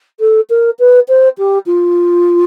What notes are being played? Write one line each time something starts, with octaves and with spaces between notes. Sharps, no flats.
A4
A#4
B4
C5
G4
F4